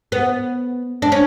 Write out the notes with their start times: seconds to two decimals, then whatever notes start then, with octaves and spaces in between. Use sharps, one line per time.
0.12 B3
1.02 D4
1.12 C#4